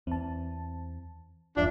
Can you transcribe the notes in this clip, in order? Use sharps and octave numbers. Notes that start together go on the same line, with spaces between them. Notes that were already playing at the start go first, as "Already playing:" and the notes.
E2 C4 A5
F1 E2 G2 D4 F4 D5 E5